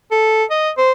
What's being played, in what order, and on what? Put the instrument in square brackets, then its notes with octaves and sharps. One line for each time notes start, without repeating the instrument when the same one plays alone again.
[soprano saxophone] A4
D#5
C5